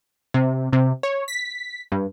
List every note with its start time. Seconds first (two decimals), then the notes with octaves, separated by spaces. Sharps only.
0.34 C3
0.73 C3
1.03 C#5
1.28 B6
1.92 G2